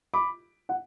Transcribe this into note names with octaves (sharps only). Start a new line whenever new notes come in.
B5 D6
F#5